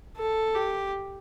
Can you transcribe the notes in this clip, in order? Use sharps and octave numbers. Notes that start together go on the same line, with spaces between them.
A4
G4